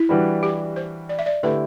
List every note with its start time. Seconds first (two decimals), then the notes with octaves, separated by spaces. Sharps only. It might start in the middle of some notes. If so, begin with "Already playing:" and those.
Already playing: E4
0.09 E3 G3 D4 F#4 B4
0.43 G4
0.76 C5
1.09 D5
1.19 E5
1.26 D5
1.43 D3 A3 E4 G4 B4